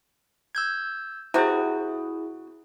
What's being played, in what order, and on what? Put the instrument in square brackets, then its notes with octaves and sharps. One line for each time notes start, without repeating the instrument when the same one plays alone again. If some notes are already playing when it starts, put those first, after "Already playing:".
[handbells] E6 G6 G#6
[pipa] C3 F#4 [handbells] E4 G#4